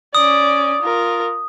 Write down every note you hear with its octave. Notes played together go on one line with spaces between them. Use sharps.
C#4 D5 D#6
F4 A#4